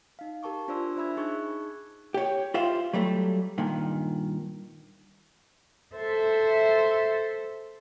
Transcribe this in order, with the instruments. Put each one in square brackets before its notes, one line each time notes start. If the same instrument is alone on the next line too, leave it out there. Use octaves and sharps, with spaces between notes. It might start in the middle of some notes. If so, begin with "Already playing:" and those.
[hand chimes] D#4 F5
G4 A#4 A5 C#6 D6
D4 F4 C5 D5 C6 E6
D4 C5 E5 B5 E6 G#6
D#4 G#4 C#6 F#6 G#6
[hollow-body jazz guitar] G4 C#5
F4 G4 C5 E5 F5
F#3 G3 A3
G2 A#2 D#3
[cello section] A4 C5 E5